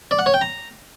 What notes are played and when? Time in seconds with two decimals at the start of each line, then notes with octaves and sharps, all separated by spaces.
0.11 D5
0.19 F#5
0.26 C#5
0.34 G5
0.41 A#5